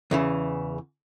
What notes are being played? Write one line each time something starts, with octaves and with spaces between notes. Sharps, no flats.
E2 C#3 E3